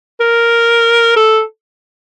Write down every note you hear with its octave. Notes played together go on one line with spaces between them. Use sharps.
A#4
A4